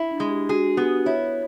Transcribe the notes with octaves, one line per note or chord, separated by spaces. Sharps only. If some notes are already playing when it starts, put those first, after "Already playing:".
Already playing: E4
D4
G#3
G4
F#4 G#4
B3 G4
E4 C#5